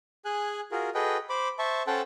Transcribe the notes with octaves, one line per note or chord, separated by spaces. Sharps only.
G#4 G#5 F#6
F4 F#4 G#4 A#4
F#4 G#4 A4 B4 D#5 G5
C5 B5 D6
C5 E5 A5 C#6
C#4 A4 C5 F#5 G5 A5